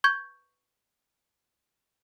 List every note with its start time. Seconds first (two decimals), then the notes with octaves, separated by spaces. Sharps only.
0.04 C#6 G6 G#6